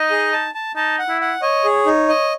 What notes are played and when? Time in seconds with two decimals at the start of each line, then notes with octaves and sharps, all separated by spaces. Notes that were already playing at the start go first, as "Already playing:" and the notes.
Already playing: D#4 D#5
0.11 G#4
0.33 A5
0.55 A5
0.76 D#4 A5
0.99 F#5
1.09 E4
1.21 F#5
1.42 C#5 D#5
1.64 G#4
1.86 D#4
2.09 D#5